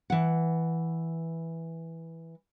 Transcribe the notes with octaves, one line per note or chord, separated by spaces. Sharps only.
E3 F#5